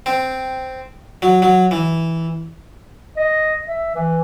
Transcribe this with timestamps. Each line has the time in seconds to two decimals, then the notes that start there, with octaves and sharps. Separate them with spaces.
0.06 C4
1.22 F#3
1.42 F#3
1.71 E3
3.17 D#5
3.67 E5
3.94 E3